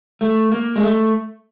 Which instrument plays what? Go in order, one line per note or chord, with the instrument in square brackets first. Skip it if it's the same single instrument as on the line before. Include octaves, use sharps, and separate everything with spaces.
[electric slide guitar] A3
A#3
G#3
A3